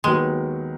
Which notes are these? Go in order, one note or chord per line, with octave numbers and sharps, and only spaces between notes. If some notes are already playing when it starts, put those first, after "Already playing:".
D#2 D#3 F#3 G#3 B3